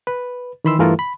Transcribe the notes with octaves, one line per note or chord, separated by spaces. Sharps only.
B4
D#3 E3 B5 C6 E6
G2 E3 A3 F4 A4 A#4
B5